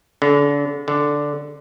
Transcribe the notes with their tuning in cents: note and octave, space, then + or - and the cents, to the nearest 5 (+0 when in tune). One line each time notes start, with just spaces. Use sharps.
D3 -35
D3 -5